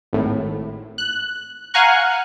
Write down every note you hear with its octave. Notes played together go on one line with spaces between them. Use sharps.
G#1 A2
F#6
F5 F#5 G#5 A#5 C#6 F#6